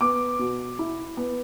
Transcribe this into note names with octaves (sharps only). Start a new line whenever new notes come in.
B3 D6
B2
E4
B3